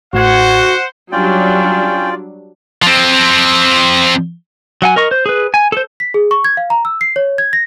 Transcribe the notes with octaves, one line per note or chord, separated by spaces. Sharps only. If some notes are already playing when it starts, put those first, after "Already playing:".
A1 A2 F#4 C5 F#5 G#6
F#3 G3 C#4 D4 F4 D5 G5
F3 C4
F#3 F#5 G#5
A#4 D#5 C#6
C5
G#4 B4
G#5
A4 C5
B6
G#4
C#6
G#6
F5
A#5
E6
C7
C#5
G#6
A#6